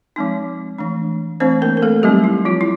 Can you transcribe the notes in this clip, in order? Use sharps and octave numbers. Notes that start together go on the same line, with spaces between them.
F3 G#3 C4 D#4
E3 A3 D4
E3 A3 C4 D4 C5
A#3 A#4
A#4
A3 A4
F#3 G3 A3 C4 D#4 G4
E4
F3 F4
E4